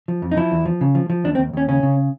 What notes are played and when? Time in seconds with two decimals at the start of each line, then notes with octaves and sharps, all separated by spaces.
0.08 F3
0.22 F2
0.31 D#4
0.37 F3 E4
0.52 E2
0.66 F3
0.81 C#3
0.95 F3
1.10 F3
1.24 D#2 D4
1.35 C4
1.38 D#2
1.53 D#2 C#4
1.68 C#3 C#4
1.83 C#3